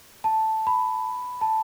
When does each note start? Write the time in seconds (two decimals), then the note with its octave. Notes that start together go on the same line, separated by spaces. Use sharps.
0.24 A5
0.67 B5
1.41 A5